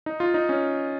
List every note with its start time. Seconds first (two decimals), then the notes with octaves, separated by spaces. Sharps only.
0.06 D#4
0.20 F4
0.34 D#4
0.49 C#4